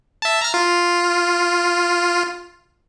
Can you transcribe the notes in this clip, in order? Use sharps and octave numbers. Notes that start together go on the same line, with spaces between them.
E5 A5
A#5 F6
F4